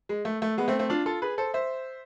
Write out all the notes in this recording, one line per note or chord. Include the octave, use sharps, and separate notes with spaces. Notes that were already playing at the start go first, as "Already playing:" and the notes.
G#3
A3
A3
G#3 B3
A3 C4
A3 C4
D4 F4
F4 A4
G#4 B4
A4 C5
C5 E5